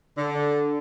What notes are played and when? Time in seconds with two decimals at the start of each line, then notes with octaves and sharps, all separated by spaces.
0.17 D3